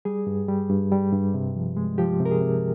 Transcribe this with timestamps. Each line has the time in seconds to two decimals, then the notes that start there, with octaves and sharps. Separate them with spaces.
0.05 G3 G#4
0.27 G2
0.48 G3
0.70 G2
0.92 G3
1.13 G2
1.34 C3
1.56 F3
1.76 G#3
1.98 F3 G4
2.20 C3
2.25 A#4
2.31 G#4
2.41 C3